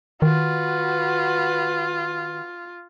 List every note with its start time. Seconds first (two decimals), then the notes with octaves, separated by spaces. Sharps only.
0.22 D#3 F4 F#4 B4